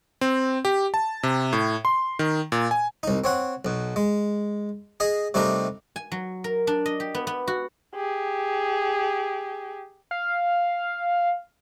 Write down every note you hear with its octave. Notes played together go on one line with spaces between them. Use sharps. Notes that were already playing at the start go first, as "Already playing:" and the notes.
C4
G4
A5
C3
A2
C6
D#3
A#2
G#5
C2 D#4
C4 C#5 F#5
B1 B2
G#3
G#4 D#5
C3 G3 A3 D4 D#4 A#4
G#5
F#3
A#4
D4
D#5
G4
B3
B3
F#4
G4 G#4
F5